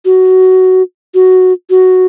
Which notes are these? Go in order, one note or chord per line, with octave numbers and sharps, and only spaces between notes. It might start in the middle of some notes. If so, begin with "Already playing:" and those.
F#4
F#4
F#4